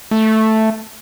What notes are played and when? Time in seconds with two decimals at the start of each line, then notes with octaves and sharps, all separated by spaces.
0.11 A3